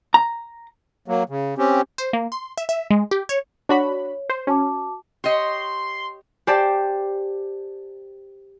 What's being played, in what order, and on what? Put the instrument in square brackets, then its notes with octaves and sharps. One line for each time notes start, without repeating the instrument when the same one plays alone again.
[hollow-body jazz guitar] A#5
[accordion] F#3 A#3
C#3
C4 C#4 G4
[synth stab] C5
A#3
C6
E5
E5
G#3
G4
C#5
[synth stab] D4 F#4 B5 [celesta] C#5
[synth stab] C5
[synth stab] C#4 [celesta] F#4 A5 D6
[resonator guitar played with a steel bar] G4 C#5 D#5 [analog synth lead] C6
[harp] G4 C5 D5 G5 A5